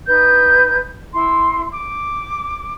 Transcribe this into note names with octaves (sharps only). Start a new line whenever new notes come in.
D#4 B4 G6
E4 C6
D6